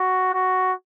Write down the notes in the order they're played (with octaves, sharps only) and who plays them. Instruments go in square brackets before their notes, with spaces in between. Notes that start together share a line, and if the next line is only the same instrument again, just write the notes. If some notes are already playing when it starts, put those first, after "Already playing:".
Already playing: [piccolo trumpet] F#4
F#4